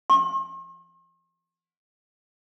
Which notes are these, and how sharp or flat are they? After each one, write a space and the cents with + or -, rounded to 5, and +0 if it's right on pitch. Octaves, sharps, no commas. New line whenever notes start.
C6 +45